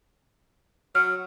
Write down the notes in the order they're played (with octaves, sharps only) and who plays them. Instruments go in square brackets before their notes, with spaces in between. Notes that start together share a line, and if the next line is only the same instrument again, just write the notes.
[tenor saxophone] F#3 [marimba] F6